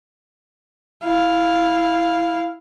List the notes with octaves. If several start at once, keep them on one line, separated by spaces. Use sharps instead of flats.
E4 F5